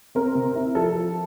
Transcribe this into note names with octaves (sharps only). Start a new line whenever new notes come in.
C4 A#4
C3
E4
F3 A4
F3